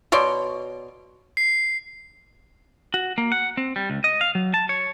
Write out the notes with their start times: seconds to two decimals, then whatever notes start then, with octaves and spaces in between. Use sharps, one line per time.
0.12 B2 C#5 D5 C6
1.37 C7
2.94 F#4
3.18 A#3
3.32 F#5
3.57 C4
3.76 G3
3.90 C#2
4.04 D#5
4.21 F5
4.35 F#3
4.54 A5
4.69 C#5